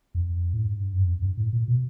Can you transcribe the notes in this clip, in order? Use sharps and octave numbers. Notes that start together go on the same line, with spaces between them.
F2
A2
G#2
G2
F#2
F2
G2
A2
A#2
B2